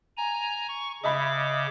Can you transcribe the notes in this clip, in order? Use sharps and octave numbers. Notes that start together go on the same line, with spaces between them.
G#5 A#5
C#6
C#3 D#5 E5 B5 D6